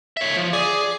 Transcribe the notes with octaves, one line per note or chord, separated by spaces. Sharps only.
C#5 E5
F3
G#4 D5